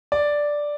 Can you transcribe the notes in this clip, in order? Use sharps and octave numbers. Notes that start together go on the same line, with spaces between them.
D5